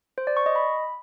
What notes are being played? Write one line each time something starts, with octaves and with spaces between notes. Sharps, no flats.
C5
D5
C#6
D#5
B5